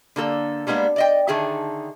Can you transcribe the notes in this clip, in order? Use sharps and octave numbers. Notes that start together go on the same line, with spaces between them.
D3 A#3 A4
G3 G#3 A#3 B3 D4
D5 D#5 G5
D3 D#3 G#4 A4 E5